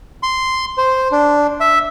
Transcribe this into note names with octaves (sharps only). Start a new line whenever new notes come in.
C6
C5
D4
E5